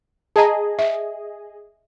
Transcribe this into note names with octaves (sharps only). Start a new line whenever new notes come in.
G#4 D#5 A5 A#5
E5